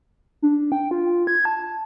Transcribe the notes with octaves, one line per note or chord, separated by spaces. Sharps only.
D4
G5
F4
G#6
A5